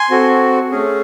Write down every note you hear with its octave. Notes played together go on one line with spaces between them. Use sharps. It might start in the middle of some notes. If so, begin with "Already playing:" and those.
Already playing: G#5 C6
C4 F#4 A4
A3 C#4 G#4